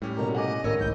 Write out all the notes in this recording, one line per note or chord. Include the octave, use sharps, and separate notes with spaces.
A2 G3 C#4 G4
B2 A3 A#3 A#5
D#5 F#5 G#5 D6
G#1 A2 C#3 A#4 C#5 E6 A#6
G1 C#2 A2 E3 G6